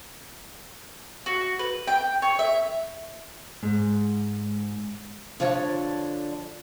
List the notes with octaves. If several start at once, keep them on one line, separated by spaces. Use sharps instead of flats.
F#4
B4
G5
C#5
E5
G#2
D3 F3 C#5 D5 A5